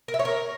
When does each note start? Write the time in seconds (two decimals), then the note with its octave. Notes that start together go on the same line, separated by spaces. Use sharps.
0.08 A#4
0.14 E5
0.19 C#5
0.25 A#4